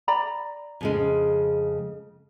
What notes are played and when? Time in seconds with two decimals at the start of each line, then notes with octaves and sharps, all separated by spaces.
0.08 D5 A#5 B5
0.81 F2 C#3 G#3